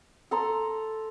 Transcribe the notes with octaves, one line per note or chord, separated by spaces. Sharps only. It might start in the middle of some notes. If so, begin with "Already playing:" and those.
A4 A#5 C6